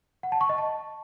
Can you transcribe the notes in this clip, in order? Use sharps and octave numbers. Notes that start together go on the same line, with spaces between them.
F#5
A5
C#6
D#5
A5